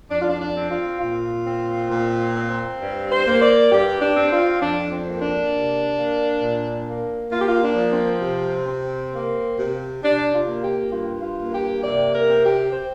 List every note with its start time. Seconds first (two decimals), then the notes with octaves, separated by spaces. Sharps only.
0.10 F2 D4
0.20 F4
0.29 D4
0.41 D4
0.55 C4
0.70 F4
1.00 A#2 F4
1.45 C4
1.90 A#2
2.35 C4
2.81 G2
3.11 C5
3.26 A#3
3.41 D5
3.71 G2 G4
4.01 D4
4.16 C4
4.32 F4
4.60 F2 D4
4.91 C4
5.06 A#3
5.21 D4
5.52 C3
5.96 A#3
6.41 A#2
6.86 A#3
7.31 A#3 F4
7.39 G4
7.47 F4
7.62 D4
7.76 F3
7.92 C4
8.22 C3
8.67 C4
9.13 A#3
9.57 C3
10.03 C3 D4
10.32 F4
10.47 A#3
10.63 G4
10.92 G2 F4
11.23 F4
11.38 A#3
11.53 G4
11.83 C3 D5
12.13 A#4
12.28 C4
12.43 G4
12.72 C5